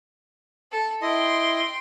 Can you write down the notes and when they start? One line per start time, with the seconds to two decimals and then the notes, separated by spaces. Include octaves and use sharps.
0.72 A4
1.02 E4 D#5 G5 C6